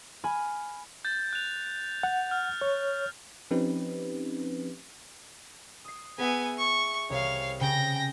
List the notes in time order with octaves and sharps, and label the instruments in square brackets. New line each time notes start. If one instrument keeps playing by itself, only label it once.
[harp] G#5 B5 F6
[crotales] G6 A6
F#6 F7
[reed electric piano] F#5
[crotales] F6
[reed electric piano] C#5
[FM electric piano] F3 C4 C#4 D#4 G4 B4
[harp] D#6 C7
[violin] B3 G#5 [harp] G#4 E5
[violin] C#6
[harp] C2 [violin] C#5 F5
[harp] C#3 [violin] G5 A#6